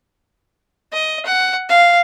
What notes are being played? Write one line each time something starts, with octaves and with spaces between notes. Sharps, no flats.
D#5
F#5
F5